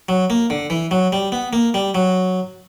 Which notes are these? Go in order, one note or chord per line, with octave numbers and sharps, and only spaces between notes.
F#3
A#3
D3
E3
F#3
G3
B3
A#3
G3
F#3